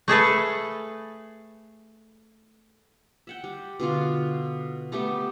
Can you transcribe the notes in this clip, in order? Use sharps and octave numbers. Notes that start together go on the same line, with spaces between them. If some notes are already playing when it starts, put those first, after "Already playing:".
A3 G#4 A4 B4
E5 F#5 G5
G3
B2 D3 F4 F5
G3 A3 B3 G4